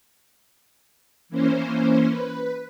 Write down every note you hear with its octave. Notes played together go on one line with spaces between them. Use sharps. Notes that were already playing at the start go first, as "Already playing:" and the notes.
E3 A#3 C#4 C5
B4